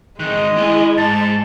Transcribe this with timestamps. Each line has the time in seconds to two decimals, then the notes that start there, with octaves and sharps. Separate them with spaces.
0.20 G#2 D#3 G#3 D#5 F#6
0.57 E4 G#5 C6
0.97 G#2 A5 A6